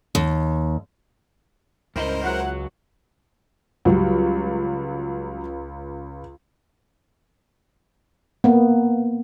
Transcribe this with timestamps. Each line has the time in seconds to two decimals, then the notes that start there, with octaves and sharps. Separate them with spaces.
0.15 D#2
1.96 C#2 G2 E4 A#4 C5 D#5
2.23 F#3 E4 F#4 F#5
3.85 C#2 F#3 G3
8.44 A#3 B3